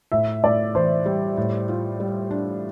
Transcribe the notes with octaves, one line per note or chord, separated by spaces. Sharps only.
A2 E5
A2 D5
E3 C5
G3
A2
F4
G3
D4